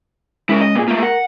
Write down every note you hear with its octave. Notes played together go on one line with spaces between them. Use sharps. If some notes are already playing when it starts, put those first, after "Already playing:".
G#3 C#4 E4 A#4
D#5
A#2 B3 G#4
A3 A#3 F4
A#4 F#5